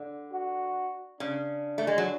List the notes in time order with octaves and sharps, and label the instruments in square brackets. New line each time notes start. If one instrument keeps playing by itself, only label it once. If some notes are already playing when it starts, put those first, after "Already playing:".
Already playing: [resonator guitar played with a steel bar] D3
[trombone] F#4
[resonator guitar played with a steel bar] C#3 [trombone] D4
[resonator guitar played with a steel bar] A3
G#3
F#3